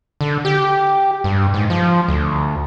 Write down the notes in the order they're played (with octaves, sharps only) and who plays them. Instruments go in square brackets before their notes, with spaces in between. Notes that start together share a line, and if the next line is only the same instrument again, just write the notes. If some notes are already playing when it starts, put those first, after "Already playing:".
[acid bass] D3
G4
G2
G#2
F3
D2